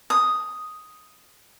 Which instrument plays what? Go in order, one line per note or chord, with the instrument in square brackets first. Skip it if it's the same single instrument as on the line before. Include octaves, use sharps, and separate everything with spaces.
[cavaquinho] D#6